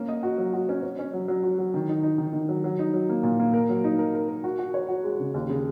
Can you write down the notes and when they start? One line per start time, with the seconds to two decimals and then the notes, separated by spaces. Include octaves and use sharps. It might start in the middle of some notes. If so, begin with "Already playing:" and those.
Already playing: A#3 C#4
0.08 D#5
0.23 F#4
0.38 F#3
0.54 F#4
0.69 C#4
0.83 C#4
0.99 C#4
1.13 F#3
1.28 F#3
1.43 F#4
1.58 F#3
1.74 D#3
1.89 D#4
2.03 D#4
2.18 D#3
2.33 D#3
2.49 F#3
2.64 F#3
2.79 D#4
2.94 F#3
3.09 A#3
3.23 A#2
3.39 A#3
3.53 A#4
3.69 F#3
3.84 D#4
3.99 A#4
4.15 A#4
4.28 A#4
4.44 F#4
4.59 F#4
4.74 C#5
4.89 F#4
5.04 G#3
5.20 C#3
5.34 D#2
5.50 C#3